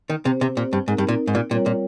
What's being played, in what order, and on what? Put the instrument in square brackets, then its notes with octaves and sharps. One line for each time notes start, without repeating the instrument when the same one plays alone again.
[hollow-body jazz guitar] D#3
[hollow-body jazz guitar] C3 [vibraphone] C4 G4 C5
[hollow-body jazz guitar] C3
A#2
G2
[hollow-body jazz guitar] G#2 [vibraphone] C4 D#4 A#4
[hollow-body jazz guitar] G2
A#2
G#2
A#2
[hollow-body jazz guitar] A#2 [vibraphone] G3 C4 F4 A#4 C#5
[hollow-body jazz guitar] A#2